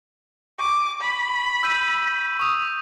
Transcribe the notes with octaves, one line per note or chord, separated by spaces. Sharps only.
C#6 D6
B5
E6 G6 D#7
C#6 D#6